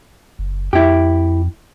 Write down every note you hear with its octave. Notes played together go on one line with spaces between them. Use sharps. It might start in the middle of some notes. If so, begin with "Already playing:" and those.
F#1
F2 E4 G4